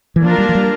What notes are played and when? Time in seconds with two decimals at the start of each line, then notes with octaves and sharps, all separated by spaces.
0.16 E3
0.23 F3 A#3 D4 F4 A#4
0.38 G3
0.49 F3
0.55 G3